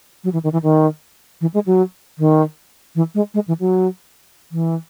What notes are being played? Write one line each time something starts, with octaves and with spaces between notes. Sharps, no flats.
F#3
E3
D#3
E3
D#3
E3
G#3
F#3
D#3
E3
G#3
G#3
E3
F#3
E3